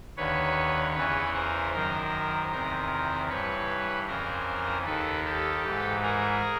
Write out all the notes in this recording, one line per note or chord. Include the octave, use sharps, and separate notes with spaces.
D#2 D3 B4 C#5
E2 C#3 E3 B4 C#5
A#4 C5
F#2 D#3 A#4 C5
E2 C3 D#3 A#4 C5
G2 E3 B4 C#5
F2 C#3 E3 A#4 C5
D#2 D#3 A4 B4
G4 A4
G#2 E3
G#4 A#4